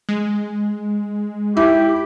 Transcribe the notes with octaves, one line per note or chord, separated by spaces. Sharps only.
G#3
E4 G4